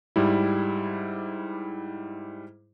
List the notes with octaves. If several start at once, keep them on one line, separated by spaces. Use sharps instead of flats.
G#2 G3 E4